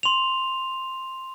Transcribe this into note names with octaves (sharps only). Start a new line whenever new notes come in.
C6 F7